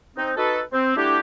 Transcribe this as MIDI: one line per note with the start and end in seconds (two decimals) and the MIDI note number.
0.17 0.32 60
0.17 0.32 63
0.37 0.60 63
0.37 0.60 66
0.37 0.60 69
0.37 0.60 71
0.72 0.96 60
0.96 1.19 55
0.96 1.19 57
0.96 1.19 62
0.96 1.19 64
0.96 1.19 66
0.96 1.19 67